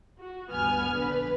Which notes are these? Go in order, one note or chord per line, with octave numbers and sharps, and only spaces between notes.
F#4
D2 G2 B3 G#5 F6
A#1 D3 B4